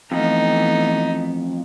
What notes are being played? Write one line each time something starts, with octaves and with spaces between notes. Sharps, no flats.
F2 E3 A3 B3 D#4